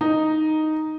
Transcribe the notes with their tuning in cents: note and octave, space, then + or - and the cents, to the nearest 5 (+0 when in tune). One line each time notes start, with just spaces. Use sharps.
D#4 +0 D#5 +0 A#5 +0